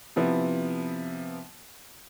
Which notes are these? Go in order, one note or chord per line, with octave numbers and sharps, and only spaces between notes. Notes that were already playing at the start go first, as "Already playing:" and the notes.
C3 F3 B3 E4